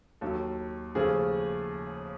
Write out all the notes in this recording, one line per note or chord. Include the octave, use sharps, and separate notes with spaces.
D#2 D#3 F#3 A4
D#2 C#3 F3 A3 G#4